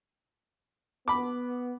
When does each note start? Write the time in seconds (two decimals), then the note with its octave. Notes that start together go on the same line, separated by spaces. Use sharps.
1.08 B3 B5 D6